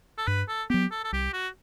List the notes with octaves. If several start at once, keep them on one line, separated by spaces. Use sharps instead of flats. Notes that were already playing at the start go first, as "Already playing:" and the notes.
A4
G2 B4
A4
F#3 B3 G4
A4
A4
C2 G4
F#4